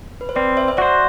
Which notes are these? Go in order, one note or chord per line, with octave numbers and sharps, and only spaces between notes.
B4
C5
C4 B4 D5
C5 E5
E5
F#4 C5 D5 F#5